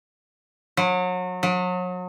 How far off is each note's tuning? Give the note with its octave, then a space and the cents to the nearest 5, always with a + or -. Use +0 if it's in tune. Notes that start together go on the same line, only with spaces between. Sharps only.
F#3 -30
F#3 -35